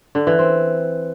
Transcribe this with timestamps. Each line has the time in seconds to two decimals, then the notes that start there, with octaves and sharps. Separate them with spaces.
0.15 D3
0.27 E3
0.39 C4